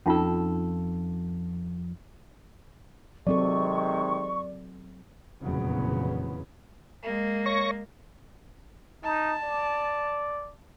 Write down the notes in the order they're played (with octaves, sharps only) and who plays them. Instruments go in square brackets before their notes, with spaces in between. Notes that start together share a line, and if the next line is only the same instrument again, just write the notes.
[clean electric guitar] F2 A4 [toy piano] C#4 D#4 F4
[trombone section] C3 D#3 G#3 [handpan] F#3 C4 A4 [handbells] D5 [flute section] C#6
[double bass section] F1 E2 A#2 C#3 F#3 B3
[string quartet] G#3 A#3
[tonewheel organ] C#5 C#6 A#6
[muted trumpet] D#4 [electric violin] A5
[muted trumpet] D5